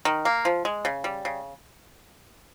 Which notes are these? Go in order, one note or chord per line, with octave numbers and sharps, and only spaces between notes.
D#3
A#3
F3
G#3
C#3
G3
C#3